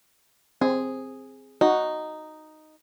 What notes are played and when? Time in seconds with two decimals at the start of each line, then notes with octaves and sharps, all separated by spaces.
0.61 C4 G#4
1.61 D#4 F#4